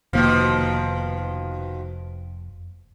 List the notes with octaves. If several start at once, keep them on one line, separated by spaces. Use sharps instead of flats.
F1 B2 D#3 F3 A#3